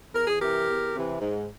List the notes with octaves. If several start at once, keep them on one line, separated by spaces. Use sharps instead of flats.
E2 A#4
G#4
C3 E3 G4 A#4
E2
C3 E3
G#2